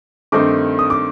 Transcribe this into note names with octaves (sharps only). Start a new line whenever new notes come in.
G2 D#3 A3 C4 D#4 D6
D#6
D6